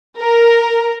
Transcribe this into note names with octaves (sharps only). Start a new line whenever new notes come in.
A#4